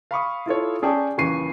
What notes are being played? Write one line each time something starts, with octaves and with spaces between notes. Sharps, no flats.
F5 B5 C#6 D#6
E4 F4 A4 C#5
C#4 G#4 D5 G5 A5 C#6
D#1 C#3 E3 C#6 C7 D#7